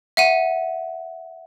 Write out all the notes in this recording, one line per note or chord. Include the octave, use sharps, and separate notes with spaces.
E5 F#5 D#7